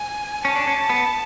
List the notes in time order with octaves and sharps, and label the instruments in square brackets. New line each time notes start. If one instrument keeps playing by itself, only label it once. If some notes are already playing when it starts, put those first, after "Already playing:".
Already playing: [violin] G#5
[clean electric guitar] C#4 [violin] A5
[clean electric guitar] D4
C#4
B3